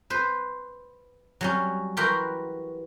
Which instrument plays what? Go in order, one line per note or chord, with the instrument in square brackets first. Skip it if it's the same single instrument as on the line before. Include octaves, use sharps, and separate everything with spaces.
[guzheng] B4 C5
F#3 G3 C#4
E3 F#4 G4 A#4 B5 C6